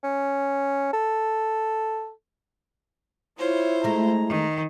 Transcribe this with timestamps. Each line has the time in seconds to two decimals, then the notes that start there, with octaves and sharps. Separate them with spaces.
0.03 C#4
0.93 A4
3.38 E4 F4 C5 C#5
3.84 G#3 A3 A#5
4.27 D#3